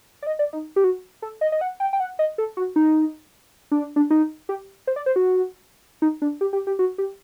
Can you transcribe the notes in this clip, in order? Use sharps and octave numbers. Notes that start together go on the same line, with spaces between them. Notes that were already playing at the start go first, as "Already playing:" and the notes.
D5
D#5
D5
D#4
G4
F#4
A4
D#5
D#5
F#5
G5
G5
F#5
D#5
A4
F#4
D#4
D4
D4
D#4
G4
C5
D5
C5
F#4
D#4
D4
G4
G4
G4
F#4
G4